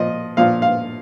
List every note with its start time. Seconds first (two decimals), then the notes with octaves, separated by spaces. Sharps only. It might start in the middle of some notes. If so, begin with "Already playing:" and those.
Already playing: A#2 F3 D#5
0.37 A#2 F3 F5
0.62 F5